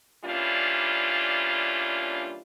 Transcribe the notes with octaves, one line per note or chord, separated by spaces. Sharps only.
E3 G3 A#3 C#4 D4 F4